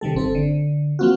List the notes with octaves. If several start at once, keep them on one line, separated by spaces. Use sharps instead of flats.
C3 D#3 G3 A4
G1 C4 A4
D3
F#3 A#3 C4 F4 F#4